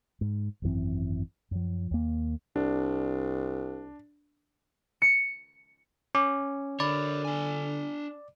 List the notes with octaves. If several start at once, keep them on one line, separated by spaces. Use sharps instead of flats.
G#2
G#1 F#2 E3 C4
F#2 F3
D#2 A#3
C2 D4
C#7
C#4 D6
D3 A#4 C#5 D5 B5
D4 G#5